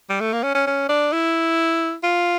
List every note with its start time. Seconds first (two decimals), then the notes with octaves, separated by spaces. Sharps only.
0.10 G3
0.20 A3
0.33 A#3
0.43 C#4
0.55 C#4
0.67 C#4
0.89 D4
1.12 E4
2.03 F4